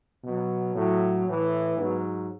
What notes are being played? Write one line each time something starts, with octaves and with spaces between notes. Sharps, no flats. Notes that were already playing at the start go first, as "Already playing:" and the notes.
B2 F#3
A2 F#3
A2 E3
G#2 F#3 B3